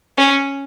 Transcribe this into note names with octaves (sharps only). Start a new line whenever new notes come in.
C#4